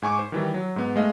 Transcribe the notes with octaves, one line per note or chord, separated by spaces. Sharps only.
G#2 G#5 C#6 D6
C5
D#3 E3 G3
F#3
G#2 B3
G#3 A3 D#5 F5